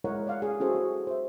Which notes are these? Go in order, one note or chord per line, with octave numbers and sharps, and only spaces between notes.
G#3 E4 A#4 C#5 D#5 F#5
D5 F5 F#5
G#4
C#4 E4 F#4 G#4 A4 C5
F#4
C5 E5